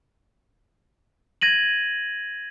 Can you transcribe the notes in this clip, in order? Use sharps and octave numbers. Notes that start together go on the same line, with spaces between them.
G#6 A#6 D#7 F#7